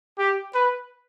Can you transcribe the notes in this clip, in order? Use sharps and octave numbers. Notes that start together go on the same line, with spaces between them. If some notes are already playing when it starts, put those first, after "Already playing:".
G4
B4